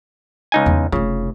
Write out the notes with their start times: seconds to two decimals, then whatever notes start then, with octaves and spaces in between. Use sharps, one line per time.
0.52 C#2 D#4 G#5
0.66 E2
0.92 F1 C#3 F4